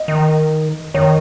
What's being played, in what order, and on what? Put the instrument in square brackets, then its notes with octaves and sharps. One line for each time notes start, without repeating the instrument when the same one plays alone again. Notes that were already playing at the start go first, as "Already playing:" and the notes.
Already playing: [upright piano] D#5
[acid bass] D#3
[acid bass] D#3 [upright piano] C#5